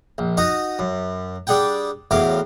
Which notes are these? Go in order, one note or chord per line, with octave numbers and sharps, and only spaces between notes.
A#1
D#4 F#4 D#5
F#2
G3 D4 G#4 F#5 G5
E2 A2 F#3 F5 D6